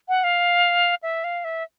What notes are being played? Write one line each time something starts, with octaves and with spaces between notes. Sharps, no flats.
F#5
F5
E5
F5
E5